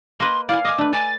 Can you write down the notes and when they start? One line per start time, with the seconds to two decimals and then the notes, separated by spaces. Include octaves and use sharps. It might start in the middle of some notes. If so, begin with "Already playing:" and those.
0.20 A#3 B4 D#5 C6
0.49 E4 D5 F5 G#5
0.65 D#5 G#5 D6
0.78 A3 D4 B4
0.93 D5 G#5 A6